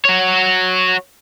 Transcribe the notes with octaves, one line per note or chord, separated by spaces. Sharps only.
F#4 C#5